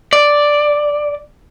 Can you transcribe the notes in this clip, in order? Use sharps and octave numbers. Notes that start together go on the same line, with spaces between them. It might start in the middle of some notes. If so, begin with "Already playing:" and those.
D5